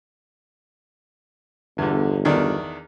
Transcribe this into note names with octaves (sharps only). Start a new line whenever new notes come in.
G1 E2 D3
E2 D#3 D4